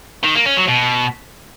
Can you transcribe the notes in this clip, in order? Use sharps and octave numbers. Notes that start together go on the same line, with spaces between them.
D#3
A#3
C#4
F#3
B2